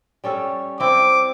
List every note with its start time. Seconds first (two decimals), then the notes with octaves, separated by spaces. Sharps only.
0.24 G3 C#4 A4
0.80 C4 E4 D6